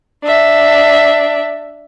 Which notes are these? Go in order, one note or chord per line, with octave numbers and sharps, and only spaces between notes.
D4 E5